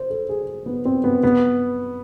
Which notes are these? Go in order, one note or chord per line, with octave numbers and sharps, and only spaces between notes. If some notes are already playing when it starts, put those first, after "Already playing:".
Already playing: C5
A4
G#4
B3
C4
B3
B3